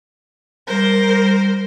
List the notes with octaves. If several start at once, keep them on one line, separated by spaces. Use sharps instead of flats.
G3 A#4 C5